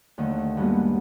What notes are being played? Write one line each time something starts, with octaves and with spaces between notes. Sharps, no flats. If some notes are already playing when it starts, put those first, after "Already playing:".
D#2 D3 A3 D#5
G2 G#3 A#3 B3 F#4